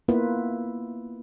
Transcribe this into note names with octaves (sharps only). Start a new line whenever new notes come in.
A#3 B3 E4 F4 B4